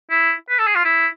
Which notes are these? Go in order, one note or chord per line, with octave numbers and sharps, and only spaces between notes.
E4
B4
A4
G#4
F4
E4